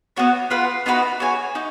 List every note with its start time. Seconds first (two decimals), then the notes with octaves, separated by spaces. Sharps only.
0.17 B3 F#4 C#5
0.51 F4 B4 F#5
0.86 B3 D#4 F#4 B4
1.20 F#4 C#5 G#5
1.55 D#4